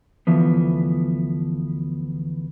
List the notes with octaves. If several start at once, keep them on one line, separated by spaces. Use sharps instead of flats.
D2 E3 F3 B3